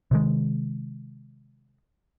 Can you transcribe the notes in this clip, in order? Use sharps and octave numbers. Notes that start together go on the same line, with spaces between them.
C3 D#3 G#3